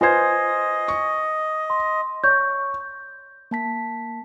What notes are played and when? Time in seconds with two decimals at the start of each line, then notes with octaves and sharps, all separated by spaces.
0.01 F4 B4 C5 D#5 G#5 G#6
0.88 C#6
1.70 C6
2.24 C#5 C#6 G6
3.51 A#3 A5 B6